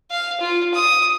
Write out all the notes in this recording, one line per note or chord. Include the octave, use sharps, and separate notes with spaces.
F5
F4
D#6